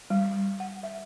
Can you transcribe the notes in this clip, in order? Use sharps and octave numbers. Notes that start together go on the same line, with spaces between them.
G3
F#5
E5